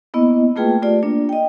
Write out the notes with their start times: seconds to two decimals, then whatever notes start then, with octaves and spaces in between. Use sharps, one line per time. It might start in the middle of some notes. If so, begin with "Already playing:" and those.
0.14 A#3 B3 E4 D#5
0.56 A3 A#3 F4 G#4 B4 G5
0.82 A3 F4 G4 D5
1.03 A#3 D4
1.29 D#5 G5